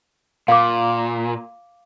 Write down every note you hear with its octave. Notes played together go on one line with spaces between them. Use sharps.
A#2 F5 D6